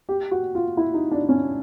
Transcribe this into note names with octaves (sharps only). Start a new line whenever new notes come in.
G4
F#4
F4
E4
D#4
D4
C#4